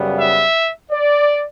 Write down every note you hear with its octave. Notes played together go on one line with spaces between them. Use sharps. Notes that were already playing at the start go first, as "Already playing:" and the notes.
Already playing: F#2 C#3 G3 B3
E5
D5